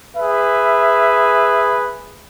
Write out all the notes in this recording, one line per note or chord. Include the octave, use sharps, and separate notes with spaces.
G#4 B4 E5